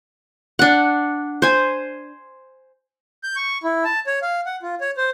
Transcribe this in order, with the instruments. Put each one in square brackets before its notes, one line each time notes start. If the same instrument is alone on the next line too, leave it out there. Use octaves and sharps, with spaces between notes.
[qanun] D4 F#5
C5 G#5
[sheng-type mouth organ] G6
C#6
E4
A5
C#5
F5
F#5
F4
C#5
C5